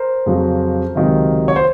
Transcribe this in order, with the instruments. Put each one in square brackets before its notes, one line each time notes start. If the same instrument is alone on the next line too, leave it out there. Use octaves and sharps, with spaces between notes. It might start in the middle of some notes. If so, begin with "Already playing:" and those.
Already playing: [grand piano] A#4 C5
F2 C#3 F#3
C#2 C3 D#3 F#3
C#5
C5